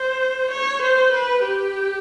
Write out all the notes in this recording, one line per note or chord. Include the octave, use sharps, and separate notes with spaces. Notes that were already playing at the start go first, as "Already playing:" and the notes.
Already playing: C5
C#5
C5
B4
G4